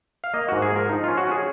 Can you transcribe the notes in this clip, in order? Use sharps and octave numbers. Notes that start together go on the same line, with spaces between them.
F5
A#3 D#5
G#2 F#4
G#4
F3 A#4
F3 D#4
C#4 F4
F#4
C#4 G#4